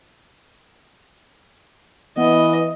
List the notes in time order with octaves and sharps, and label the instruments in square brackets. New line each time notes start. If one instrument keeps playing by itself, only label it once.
[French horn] E3 [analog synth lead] B3 [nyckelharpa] D#5